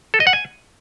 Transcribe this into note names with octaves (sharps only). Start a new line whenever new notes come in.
A4
D#5
F#5
G#5